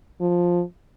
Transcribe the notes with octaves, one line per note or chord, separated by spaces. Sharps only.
F3